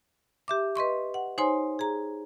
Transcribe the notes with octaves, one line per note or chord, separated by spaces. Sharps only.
G4 E5 D6
B4 D#5 C6 C#6
F#5
D#4 C5 C#5 G#5 C6
G#4 A#5